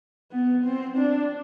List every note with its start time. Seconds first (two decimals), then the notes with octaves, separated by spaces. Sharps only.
0.32 B3
0.64 C4
0.98 D4